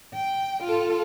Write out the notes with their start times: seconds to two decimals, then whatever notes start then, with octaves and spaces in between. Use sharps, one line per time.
0.14 G5
0.64 F4 A4